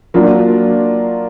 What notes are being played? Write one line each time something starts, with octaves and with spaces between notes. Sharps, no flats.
F#3 A#3 D4 F4